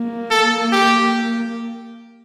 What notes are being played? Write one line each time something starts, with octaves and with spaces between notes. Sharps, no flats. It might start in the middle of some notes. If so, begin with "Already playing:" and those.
Already playing: A#3
A4
G4